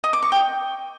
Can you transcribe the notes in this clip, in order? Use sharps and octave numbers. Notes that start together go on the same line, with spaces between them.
D#5
D6
C#6
G5